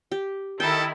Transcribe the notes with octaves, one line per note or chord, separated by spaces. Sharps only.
G4
D#3 E4 A4 G5